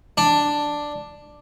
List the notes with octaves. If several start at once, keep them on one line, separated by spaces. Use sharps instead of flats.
D4